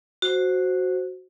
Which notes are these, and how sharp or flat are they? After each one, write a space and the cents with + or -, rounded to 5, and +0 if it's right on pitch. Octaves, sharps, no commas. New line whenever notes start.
F#4 +0 C5 +0